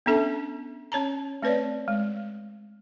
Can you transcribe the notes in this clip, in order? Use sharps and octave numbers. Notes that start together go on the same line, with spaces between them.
B3 C#4 D4 A4 E5 A5
C#4 C#5 A5 A#5
A3 C4 B4 C#5 D5
G#3